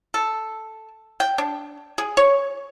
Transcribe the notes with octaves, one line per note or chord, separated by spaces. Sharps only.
A4
G5
D4
G#4
C#5